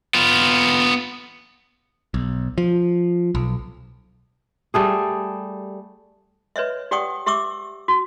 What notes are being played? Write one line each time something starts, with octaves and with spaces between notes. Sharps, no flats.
B3 F4
B1
F3
B1
G3 A3 G#4
B4 C#5 D#5 E5
G4 D5 F#5 G5 C#6 D#6
G4 E5 C#6 D6 E6
F#4